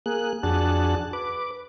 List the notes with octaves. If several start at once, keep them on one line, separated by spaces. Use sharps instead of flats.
A#3 G#4 F#6
F2 D4 F#4 G#4 A5 F#6
B4 D6